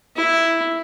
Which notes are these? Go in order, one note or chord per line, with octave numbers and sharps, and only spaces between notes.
E4